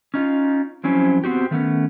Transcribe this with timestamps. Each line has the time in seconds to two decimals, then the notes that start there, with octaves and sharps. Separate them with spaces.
0.14 C#4 D#4 F4
0.84 F3 F#3 C4 C#4 E4
1.24 B3 C4 F#4 G4
1.51 D#3 A3 B3 C#4